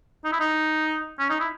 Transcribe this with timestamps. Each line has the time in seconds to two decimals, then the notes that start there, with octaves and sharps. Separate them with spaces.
0.25 D#4
0.32 E4
0.40 D#4
1.19 C#4
1.30 D#4
1.40 E4